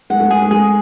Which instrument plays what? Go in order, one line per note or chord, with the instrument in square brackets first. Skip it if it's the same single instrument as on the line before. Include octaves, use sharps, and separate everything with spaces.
[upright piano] G#3 [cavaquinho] F#5
[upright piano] A3
[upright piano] G#3 [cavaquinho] G#4
[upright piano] A3
[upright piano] G#3 [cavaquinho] G#4